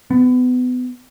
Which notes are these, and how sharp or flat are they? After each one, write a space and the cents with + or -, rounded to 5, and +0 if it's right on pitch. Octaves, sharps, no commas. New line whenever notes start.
B3 +25